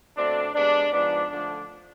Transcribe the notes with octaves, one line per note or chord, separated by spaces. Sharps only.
B2 A3 C4 D4
C3 G#3 B3 D4
G#2 F3 B3 D4
D3 F3 A3 D4